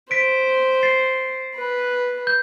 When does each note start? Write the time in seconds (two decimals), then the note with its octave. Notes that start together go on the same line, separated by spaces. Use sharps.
0.11 C5 B6 D7
0.83 A6 C7
1.55 B4
2.27 G6